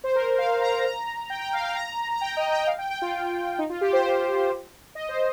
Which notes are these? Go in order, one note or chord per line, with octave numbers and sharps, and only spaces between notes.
C5
A#4
F5
A#5
A#5
G5
G5
F5
F5
A#5
A#5
G5
D#5
G5
F5
G5
G5
F4
D#4
F4
G4
C5
D#5
C5